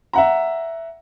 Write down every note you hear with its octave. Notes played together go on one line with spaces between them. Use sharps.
E5 F#5 A#5